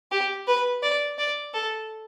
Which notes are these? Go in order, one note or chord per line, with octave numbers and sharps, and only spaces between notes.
G4
B4
D5
D5
A4